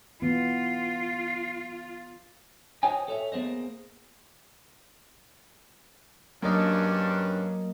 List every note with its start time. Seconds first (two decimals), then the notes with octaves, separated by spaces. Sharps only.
0.22 E3 B3 F4
2.83 F#4 C5 C#5 D#5 G5 G#5
3.08 A4 C#5 E5
3.32 A#3 B3 G#4 C5 D#5
6.42 G2 F#3 A#3 C#4 D4 A#4 D#5